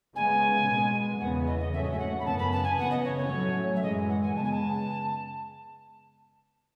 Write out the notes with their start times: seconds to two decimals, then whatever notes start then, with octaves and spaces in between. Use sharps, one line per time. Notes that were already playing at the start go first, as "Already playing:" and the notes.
0.14 C#3 G#3 B3 G#5
0.67 B2 G#3 B3
1.20 E2 C#3 E3 B3 F#5
1.47 D#5
1.59 D#5
1.73 G#2 F#3 A3 C#4 E5
1.83 D#5
1.91 E5
1.99 F#5
2.19 B5
2.24 F#2 C#3 E3 B3 A5
2.38 B5
2.52 A5
2.64 G#5
2.78 C#3 E3 B3 F#5
2.90 D#5
3.04 C#5
3.17 C#5
3.30 A2 F#3 A3 C#4
3.76 E5
3.82 F#2 E3 G#3 D#5
4.09 F#5
4.22 G#5
4.35 C#3 G#3 B3 A5
4.44 G#5
4.52 A5